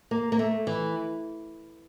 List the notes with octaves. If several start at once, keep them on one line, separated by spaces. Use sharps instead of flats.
A#3
A#3
A3
E3